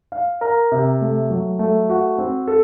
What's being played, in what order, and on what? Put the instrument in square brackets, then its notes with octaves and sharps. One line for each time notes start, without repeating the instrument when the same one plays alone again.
[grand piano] F5
A#4
C3
A3
F#3
A3
F#4
C4
A4